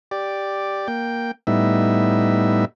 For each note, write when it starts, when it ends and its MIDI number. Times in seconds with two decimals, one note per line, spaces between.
0.11 0.88 67
0.11 0.88 74
0.88 1.31 58
0.88 1.31 79
1.47 2.65 45
1.47 2.65 55
1.47 2.65 59
1.47 2.65 63
1.47 2.65 76